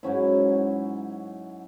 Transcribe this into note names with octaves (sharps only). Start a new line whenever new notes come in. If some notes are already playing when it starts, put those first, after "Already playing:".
G#2 F#3 C#4 E4